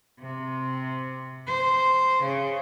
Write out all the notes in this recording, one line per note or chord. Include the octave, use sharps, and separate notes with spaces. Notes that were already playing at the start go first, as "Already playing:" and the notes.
C3
C5
C#3